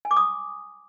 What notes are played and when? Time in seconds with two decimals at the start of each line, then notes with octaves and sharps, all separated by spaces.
0.05 G#5
0.11 D6
0.17 D#6